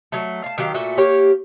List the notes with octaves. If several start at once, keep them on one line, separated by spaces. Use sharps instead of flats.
F#3 A3
F5 A5
D#3 F#3 G4 F5
A#2 A3 F#4 E5
A#3 G4 C#5